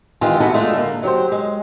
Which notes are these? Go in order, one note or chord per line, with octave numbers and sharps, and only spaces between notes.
D#3 E3 G#3 F4 G4
A3 B3 E4 F#4 A4
G#3 A3 D4 F4
D3 A#3
F#3 G4 C5
G#3